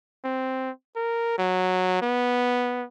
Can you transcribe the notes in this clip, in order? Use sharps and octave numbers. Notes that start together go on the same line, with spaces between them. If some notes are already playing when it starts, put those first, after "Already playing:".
C4
A#4
F#3
B3